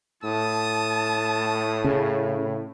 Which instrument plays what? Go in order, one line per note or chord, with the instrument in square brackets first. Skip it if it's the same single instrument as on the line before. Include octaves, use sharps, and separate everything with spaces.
[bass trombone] A2 [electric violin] A5 [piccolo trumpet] D#6
[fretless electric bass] C#3